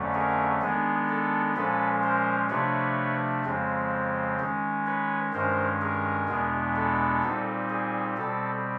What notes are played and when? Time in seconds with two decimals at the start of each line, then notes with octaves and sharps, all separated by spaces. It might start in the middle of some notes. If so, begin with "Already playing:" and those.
Already playing: F2 D3 F#3 A3 C#4
0.14 G#4 A#4
0.62 D#3 G#3 B3 D4 G#4
1.09 A4
1.56 A#2 F3 G#3 C#4 A4 B4
2.03 A#4 C5
2.50 C3 F3 A3 D4 B4 C#5
3.45 F2 C#3 F3 G#3 C4
4.40 D#3 G#3 C#4
4.86 B4 C#5
5.34 G2 D#3 G#3 C#4 A#4 C5
5.81 G#4 A#4
6.29 E2 B2 G#3 B3 D4
6.76 A4
7.23 A#2 G3 C4 D#4
7.70 G#4
8.17 B2 G3 C4 A4